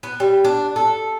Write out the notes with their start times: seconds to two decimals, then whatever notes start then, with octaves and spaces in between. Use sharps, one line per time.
0.03 B3
0.20 G3
0.45 D4
0.76 A4